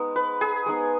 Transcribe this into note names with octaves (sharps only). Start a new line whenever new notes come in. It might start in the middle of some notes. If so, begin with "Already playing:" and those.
Already playing: G#3 B3 D#4
B4
G#4
G#3 B3 D#4